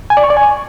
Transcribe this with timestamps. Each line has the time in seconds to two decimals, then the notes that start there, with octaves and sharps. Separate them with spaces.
0.10 G#5
0.17 D5
0.23 C#6
0.30 D5
0.37 G#5